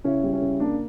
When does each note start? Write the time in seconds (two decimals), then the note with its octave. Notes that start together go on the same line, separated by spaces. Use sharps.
0.04 C#3 C#4 E4
0.23 G3
0.32 C#4 E4
0.42 C#3
0.60 A#3 D4